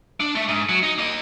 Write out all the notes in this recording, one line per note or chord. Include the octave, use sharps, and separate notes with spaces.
D4
A3 E5
G#2
F#3
D#4
A#3 D#5